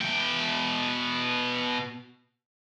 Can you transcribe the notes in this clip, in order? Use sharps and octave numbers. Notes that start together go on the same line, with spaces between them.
B2 G5